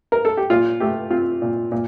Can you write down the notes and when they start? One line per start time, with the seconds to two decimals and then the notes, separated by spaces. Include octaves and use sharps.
0.12 A#4
0.25 A4
0.37 G4
0.50 A#2 F4
0.80 A3 G4
1.11 C4 F4
1.42 A#2
1.72 A#2